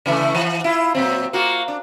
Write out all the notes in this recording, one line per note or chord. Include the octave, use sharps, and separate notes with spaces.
C#3 E3 A3
E3
E4 F4
A#2 F#3 C4
A#3 F4 F#4
D4